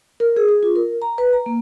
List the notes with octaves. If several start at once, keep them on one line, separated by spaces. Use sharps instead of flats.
A#4
G#4
G#4
F4
A#4
A#5
B4
A#5
A#3